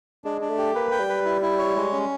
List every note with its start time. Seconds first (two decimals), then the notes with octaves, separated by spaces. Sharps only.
0.24 G#3 D4
0.41 D4
0.50 A3
0.58 G4
0.75 A#3 B4
0.92 G5
1.00 G3
1.09 B4
1.25 E4
1.42 E4
1.59 C#5
1.76 G#3
1.93 C#4